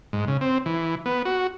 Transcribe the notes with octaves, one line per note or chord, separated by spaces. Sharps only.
G#2
C#3
C4
E3
B3
F#4